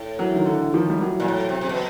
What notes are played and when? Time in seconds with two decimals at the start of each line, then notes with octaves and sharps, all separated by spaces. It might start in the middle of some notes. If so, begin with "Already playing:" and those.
Already playing: A2
0.19 E3 F#3
0.36 D#3
0.46 D3 E3
0.74 D#3 F3
0.90 G3
1.01 E3 F#3
1.20 A#2
1.28 A2
1.49 C3
1.61 C3
1.69 B2